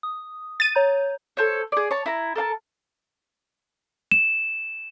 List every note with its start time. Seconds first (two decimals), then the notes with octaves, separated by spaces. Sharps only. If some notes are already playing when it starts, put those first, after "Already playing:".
0.03 D#6
0.60 A6 D#7
0.75 C#5 A#5 G6
1.37 A4 C5 C#5
1.72 G#4 D5
1.91 C#5 A5
2.06 E4 A#5
2.35 A4 A#4 F5 A5
4.11 E7